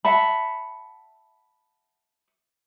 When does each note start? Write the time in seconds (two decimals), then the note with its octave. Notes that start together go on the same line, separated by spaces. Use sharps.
0.05 E5 F#5 A5 B5